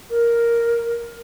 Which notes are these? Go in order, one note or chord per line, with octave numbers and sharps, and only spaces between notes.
A#4